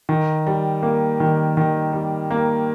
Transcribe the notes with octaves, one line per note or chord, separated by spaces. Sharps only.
D#3
G3
A#3
D#3
D#3
G3
A#3